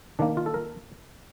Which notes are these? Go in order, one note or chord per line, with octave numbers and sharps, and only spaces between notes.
D#3 A#3 D4
F4
A4
A#4